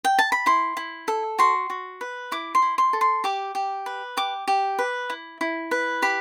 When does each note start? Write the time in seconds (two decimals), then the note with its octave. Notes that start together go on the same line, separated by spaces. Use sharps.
0.04 G5
0.19 A5
0.32 B5
0.46 E4 C6
0.77 E4
1.08 A4
1.39 F#4 C6
1.70 F#4
2.01 B4
2.32 E4 D6
2.55 C6
2.62 E4
2.78 C6
2.93 A4
3.01 C6
3.24 G4 D6
3.55 G4
3.86 B4
4.17 G4 D6
4.48 G4
4.79 B4
5.10 E4
5.41 E4
5.71 B4
6.02 G4 B5